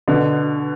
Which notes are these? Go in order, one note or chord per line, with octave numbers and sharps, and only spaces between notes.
B2 D3